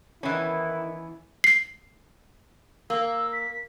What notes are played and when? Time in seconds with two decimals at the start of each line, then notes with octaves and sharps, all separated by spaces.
0.23 D#3 E3 B3 C#4 E4
1.44 C7
2.90 A#3 E6
3.32 B6